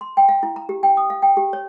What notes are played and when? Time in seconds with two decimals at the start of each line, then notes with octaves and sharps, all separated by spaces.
0.01 C6
0.17 G5
0.29 F5
0.43 E4
0.56 A#5
0.69 G4
0.83 G5
0.97 D#6
1.10 F5
1.22 G5
1.37 G4
1.53 C#5